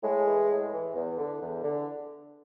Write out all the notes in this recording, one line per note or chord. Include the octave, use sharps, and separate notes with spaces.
A2 G#3
E3
A2
E3
E2
D3
E2
D3